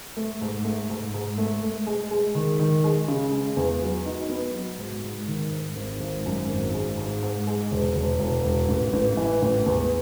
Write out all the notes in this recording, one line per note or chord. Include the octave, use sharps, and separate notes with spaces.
A3
G#2
A3
G#2
G#2
A3
A3
G#3
G#3
D#3
D#3
G#3
C#3
G#3
E2
F#3
D#4
B3
F#3
G#2
G#2
D#3
G#2
G#1
G#1
F#2
G#1
G#3
G#2
G#2
G#3
E1
E1
E1
E1
A1
A1
E3
A1
E2